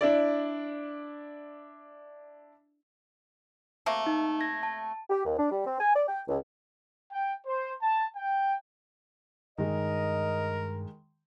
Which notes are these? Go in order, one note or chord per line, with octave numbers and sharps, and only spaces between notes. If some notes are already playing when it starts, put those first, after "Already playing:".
D4 E4 D5
C3 A3 A#3
D#4
G#6 A#6
A5
G4
D#2
D4
G3
C4
G#5
D5
G5
C#2
G5
C5
A5
G5
G2 D#3 G#3 A#4 D#5